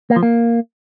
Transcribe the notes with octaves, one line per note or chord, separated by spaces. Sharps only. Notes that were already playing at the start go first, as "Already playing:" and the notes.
A#3
F3
A#3